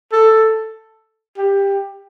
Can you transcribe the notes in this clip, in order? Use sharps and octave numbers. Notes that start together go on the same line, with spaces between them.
A4
G4